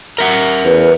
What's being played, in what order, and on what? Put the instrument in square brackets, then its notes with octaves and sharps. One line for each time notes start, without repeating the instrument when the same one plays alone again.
[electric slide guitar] A#4 E5 F#5
[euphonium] E2 [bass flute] B4